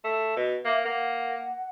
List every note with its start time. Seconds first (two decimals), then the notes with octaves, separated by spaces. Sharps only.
0.04 A3
0.36 B2
0.65 A#3 E5
0.85 A#3 F#5